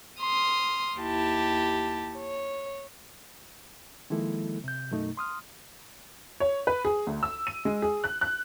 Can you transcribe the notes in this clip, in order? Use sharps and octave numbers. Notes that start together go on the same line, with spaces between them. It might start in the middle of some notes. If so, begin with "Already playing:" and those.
C6 D#6 F6
D#2 E4 G4 A5
C#5
D#3 F3 G#3 A#3 E4 A4
C3 G6
F#2 B2 A3 D#4
C6 D#6 F6
C#5
B4
G#4
D2
E6
D#7
G#3
G#4
F#6
F#6